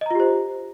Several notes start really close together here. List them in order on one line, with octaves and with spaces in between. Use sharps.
D#5 A#5 F4 G4 C5